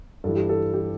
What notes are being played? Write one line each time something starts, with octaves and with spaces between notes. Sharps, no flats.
G2 E3 A4
G4
A4
G4